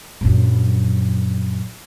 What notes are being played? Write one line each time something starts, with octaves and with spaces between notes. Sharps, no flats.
A#1 F#2